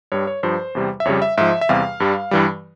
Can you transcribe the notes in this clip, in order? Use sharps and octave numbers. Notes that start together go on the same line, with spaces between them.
G2 G3 C#5
C#5
G2 F3 C5
E2 C3 G3
E5
F2 C#3 G3 C#5
E5
G#2 F3 E5
E5
E2 C3 G3 F5
G2 G3
G2 E3 G3